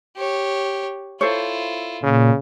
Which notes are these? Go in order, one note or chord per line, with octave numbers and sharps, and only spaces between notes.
G4 C#5
E4 F4 A4 C5 C#5
A#2 C#3